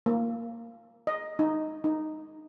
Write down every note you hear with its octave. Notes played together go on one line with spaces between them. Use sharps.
A#3
D#5
D#4
D#4